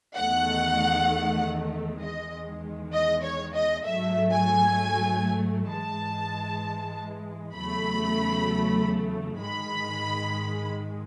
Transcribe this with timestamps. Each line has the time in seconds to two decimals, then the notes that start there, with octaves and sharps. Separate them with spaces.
0.16 E2 D#3 A3 F#5
2.01 E2 D#3 G#3 D#5
2.94 D#5
3.24 C#5
3.55 D#5
3.85 G#2 F#3 A3 E5
4.32 G#5
5.70 G#2 E3 G#3 A5
7.55 E2 C#3 F#3 A3 B5
9.39 G#2 D#3 G#3 B5